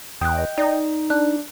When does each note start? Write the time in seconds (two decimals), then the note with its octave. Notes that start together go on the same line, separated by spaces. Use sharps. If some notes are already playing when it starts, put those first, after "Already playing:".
0.21 E2 G5 D#6 F#6
0.38 D#5
0.58 D#4 D5 A#6
1.10 D4 F#6